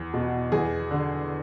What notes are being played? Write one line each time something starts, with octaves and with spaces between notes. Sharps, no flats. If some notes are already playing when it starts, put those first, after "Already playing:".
Already playing: E2
B2
E2 G#4
D3